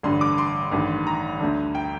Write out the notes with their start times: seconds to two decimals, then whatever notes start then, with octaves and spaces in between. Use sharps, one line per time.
0.03 A1 G2 D3 C6
0.21 D6
0.38 C6
0.72 A1 G2 D#3
1.07 A#5
1.40 D2 D3
1.75 G5